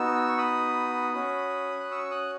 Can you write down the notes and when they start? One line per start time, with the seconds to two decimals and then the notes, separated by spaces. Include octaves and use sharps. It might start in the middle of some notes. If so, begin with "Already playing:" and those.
Already playing: B3 D#4 F#4 E6
0.29 C#6
0.38 B5 D#6
1.14 C#4 F#4
1.80 F#6
1.91 C#6 E6
2.11 D#6 F#6